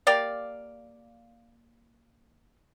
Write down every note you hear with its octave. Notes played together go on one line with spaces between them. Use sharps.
A#3 G4 D5 F5